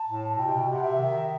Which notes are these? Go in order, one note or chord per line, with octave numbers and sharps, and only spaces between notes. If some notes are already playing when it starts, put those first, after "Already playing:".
Already playing: A5
A2
B2 G5
C3
B2
C3 F#5
E5
D#3